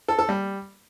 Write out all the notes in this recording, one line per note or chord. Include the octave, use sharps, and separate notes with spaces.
A4
A4
G3